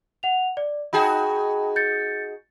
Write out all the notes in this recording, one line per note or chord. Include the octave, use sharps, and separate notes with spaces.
F#5 F7
D5
D#4 F#4 G#4 G5 A5 B5
G6 A6 C#7